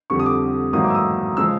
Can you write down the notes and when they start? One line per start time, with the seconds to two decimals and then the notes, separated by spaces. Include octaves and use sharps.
0.10 F2 D3 G3 C#6
0.20 D#6
0.26 D6
0.73 A1 G#2 D#3 F#3 A#3 D#6
0.84 D6
0.90 E6
0.95 D#6
1.37 C#3 F3 G#3 E6